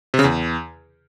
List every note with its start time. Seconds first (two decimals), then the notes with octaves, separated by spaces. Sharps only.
0.14 C3
0.19 C#3
0.24 E2